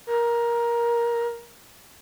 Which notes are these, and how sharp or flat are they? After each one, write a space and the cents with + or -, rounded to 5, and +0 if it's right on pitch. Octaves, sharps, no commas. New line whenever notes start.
A#4 +15